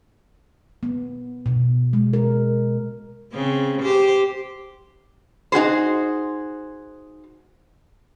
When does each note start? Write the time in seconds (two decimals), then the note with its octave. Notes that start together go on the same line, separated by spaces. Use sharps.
0.83 B3
1.46 B2
1.93 G#3
2.13 A#4
3.33 C#3 C4
3.82 G4 C5
5.52 D#4 F#4 G#4 C5